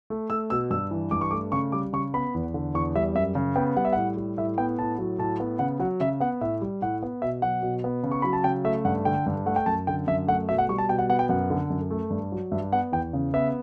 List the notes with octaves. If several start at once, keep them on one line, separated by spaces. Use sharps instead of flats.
A3
A3 E6
B2 E6
G2 E6
E3
G2 D6
C#6
A3 D6
C#3 C#6
G3 D6
C#3 C#6
B3 B5
E2
D3
E2 C#6
G3 E5
F#2 E5
C#3
B3 G5
G3 F#5
E5
A2 F#5
G3
A2 E5
B3 G5
A2 A5
F#3
A2 A5
B3
C#3 F#5
F#3 F#5
C#3 E5
B3 F#5
A2 E5
G3
A2 F#5
B3
B2 E5
F#3 F#5
B2
B3
C#3
C#6
F#3 B5
A5
C#3 G5
A3 E5
G2 F#5
D3 G5
G2
A3 F#5
G5
F#2 A5
D3 G5
F#2 E5
A3 F#5
B2 E5
F#5
G3 C#6
A5
B2 G5
F#5
B3 F#5
G5
F#2 F#5
D3
F#2
A3
G2
F#3
G2 E5
B3 F#5
E2 G5
C#3
B3 E5